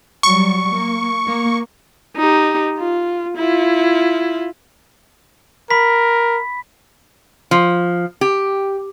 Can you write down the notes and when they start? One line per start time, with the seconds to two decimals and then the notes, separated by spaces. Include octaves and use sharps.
0.23 F#3 G3 C#6
0.72 A#3
1.25 A#3
2.16 D#4 G4
2.79 F4
3.37 E4 F4
5.71 A#4 B5 B6
7.51 F3
8.21 G4